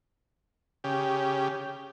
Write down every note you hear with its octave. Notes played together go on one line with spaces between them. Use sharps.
C#3 G4